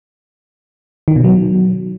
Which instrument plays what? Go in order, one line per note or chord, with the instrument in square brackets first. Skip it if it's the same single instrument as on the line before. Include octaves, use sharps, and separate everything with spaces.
[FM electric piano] D#3
B2
F#3